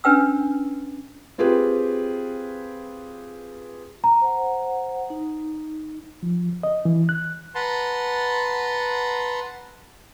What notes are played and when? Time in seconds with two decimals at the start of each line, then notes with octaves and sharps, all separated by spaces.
0.04 C#4 D4 B4 G5 E6
1.38 C4 F4 G4 G#4 B4
4.04 A#5
4.21 C5 F#5
5.10 D#4
6.23 F3
6.63 D#5
6.85 E3
7.09 F#6
7.55 B4 F#5 A5 A#5 C6